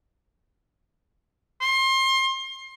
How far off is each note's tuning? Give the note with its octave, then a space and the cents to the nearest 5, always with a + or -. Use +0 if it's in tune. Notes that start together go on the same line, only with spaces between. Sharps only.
C6 +30